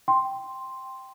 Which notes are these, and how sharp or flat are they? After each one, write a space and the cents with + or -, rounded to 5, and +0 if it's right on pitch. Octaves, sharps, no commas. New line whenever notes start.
G5 +0 C6 +0